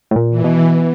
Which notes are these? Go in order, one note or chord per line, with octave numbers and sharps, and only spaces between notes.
A2
A#2
E3
B2